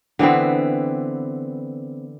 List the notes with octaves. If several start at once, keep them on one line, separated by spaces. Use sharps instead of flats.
D3 E3 B3 C4